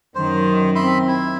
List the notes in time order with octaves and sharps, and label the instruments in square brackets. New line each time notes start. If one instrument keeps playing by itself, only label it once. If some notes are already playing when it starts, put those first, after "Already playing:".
[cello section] F#2 D#3 [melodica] C5
[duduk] C4 [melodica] E5 B5 C6
[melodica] E4